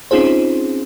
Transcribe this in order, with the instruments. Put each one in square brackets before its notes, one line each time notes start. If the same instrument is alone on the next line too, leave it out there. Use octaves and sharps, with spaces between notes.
[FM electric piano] C4 C#4 D#4 F4 G#4 C5